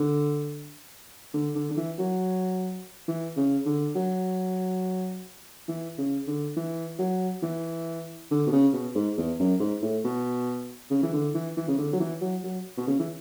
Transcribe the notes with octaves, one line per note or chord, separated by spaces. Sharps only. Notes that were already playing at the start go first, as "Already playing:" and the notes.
Already playing: D3
D3
D3
D3
E3
F#3
E3
C#3
D3
F#3
E3
C#3
D3
E3
F#3
E3
D3
B2
C#3
B2
G#2
E2
F#2
G#2
A2
B2
C#3
E3
D3
E3
E3
C#3
D3
F#3
E3
F#3
F#3
B2
C#3
E3